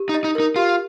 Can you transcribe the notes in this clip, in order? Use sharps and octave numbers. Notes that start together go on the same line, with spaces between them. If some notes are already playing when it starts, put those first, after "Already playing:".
Already playing: G4
D#4
D#5
D#4
D#4 A#4
F4 G4